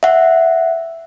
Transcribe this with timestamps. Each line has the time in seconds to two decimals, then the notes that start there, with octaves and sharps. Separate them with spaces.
0.03 E5 F#5